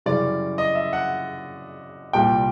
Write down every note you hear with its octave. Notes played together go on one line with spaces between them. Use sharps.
F#2 C#3 E3 G3 D5
D#5
E5
F#5
C2 A#2 G3 A#3 G5